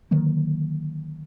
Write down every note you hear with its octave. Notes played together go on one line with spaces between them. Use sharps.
D3 D#3 F#3 A#3